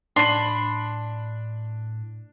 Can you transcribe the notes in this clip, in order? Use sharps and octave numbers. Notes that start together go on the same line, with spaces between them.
A2 D4 B5 C6